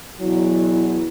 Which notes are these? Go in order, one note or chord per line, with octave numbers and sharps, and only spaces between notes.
E2 B2 F#3 E4